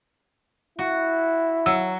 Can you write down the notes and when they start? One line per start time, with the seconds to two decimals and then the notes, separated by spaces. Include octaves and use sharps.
0.79 E4 F#4
1.66 F#3 E6